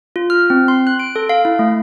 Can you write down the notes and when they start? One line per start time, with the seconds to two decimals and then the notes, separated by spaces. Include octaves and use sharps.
0.16 F4
0.30 F6
0.50 C4
0.68 C6
0.87 F#6
0.99 D7
1.16 A4
1.29 F5
1.45 E4
1.59 A3